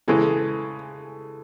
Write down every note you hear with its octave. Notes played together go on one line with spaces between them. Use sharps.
C#3 E3 G#3 A4